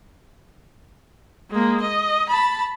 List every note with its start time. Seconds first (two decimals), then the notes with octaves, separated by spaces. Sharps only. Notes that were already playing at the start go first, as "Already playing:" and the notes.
1.51 G#3 A#3
1.81 D#5
2.29 A5 B5